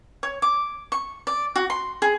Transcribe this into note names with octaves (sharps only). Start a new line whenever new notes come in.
C#5
D6
C#6
D5
F#4
C6
G#4